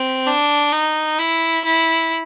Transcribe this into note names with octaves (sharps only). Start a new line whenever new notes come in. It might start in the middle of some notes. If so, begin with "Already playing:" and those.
Already playing: C4
D4
D#4
E4
E4